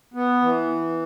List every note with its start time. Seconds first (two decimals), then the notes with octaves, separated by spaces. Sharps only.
0.14 B3
0.42 E3